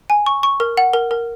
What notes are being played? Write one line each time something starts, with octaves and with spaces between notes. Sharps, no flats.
G#5
C#6
C#6
A#4
F#5
A#4
A#4